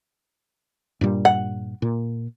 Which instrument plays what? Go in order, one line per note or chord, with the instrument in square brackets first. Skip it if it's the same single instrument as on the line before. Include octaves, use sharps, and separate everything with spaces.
[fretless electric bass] G2 A#2 G3
[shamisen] F#5
[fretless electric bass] A#2